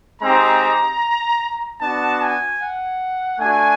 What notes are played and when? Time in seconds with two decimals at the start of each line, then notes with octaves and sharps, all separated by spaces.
0.21 G#3 C4 D#4 G4 A#5
1.80 B3 D4 F#4 A5
2.21 G#5
2.61 F#5
3.39 A3 D4 F#4 G#5